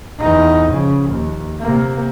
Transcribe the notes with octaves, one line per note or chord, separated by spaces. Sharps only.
E2 D#4
C#3 F3
D#2
C3 A#3